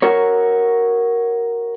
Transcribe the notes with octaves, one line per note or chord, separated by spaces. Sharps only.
F#4 A#4 C#5